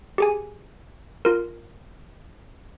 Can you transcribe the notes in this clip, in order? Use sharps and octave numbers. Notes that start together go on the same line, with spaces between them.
G4 G#4 G#5
F4 A#4